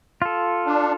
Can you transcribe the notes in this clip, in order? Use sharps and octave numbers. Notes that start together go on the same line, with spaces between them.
F4 A4
D4